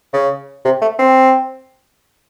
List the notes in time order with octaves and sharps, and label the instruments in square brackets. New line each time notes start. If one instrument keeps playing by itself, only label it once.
[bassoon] C#3
C3
A3
C4